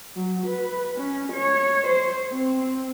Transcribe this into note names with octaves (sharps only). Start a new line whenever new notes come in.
F#3
B4
C#4
C#5
C5
C4